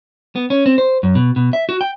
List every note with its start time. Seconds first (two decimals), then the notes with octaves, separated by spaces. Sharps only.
0.36 B3
0.50 C#4
0.66 C4
0.78 C5
1.03 F#2
1.15 B2
1.36 B2
1.53 E5
1.69 F#4
1.81 G5